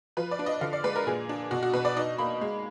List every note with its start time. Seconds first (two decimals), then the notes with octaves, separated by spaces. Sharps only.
0.17 F3 B4
0.31 D5
0.39 D4
0.46 D#5
0.61 D3 F5
0.73 D5
0.84 G#3 B4
0.96 A#4
1.07 A#2 G#4
1.29 D4
1.51 B2 F#4
1.63 F#4
1.73 B2 B4
1.85 D5
1.96 D#4 D#5
2.18 A#3 B5
2.41 G#3